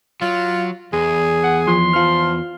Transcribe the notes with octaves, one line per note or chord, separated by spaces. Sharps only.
F#3 F4
E2 G#4
F#5
F3 C6
F3 F4 F6